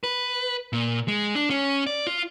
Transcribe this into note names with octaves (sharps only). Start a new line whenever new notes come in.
B4
A#2
G#3
D4
C#4
D5
F4